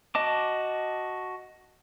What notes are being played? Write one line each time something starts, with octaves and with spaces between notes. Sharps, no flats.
F#4 D#5 A5 D6